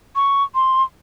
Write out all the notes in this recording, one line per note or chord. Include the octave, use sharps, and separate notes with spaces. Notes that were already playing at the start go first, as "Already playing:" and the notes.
C#6
C6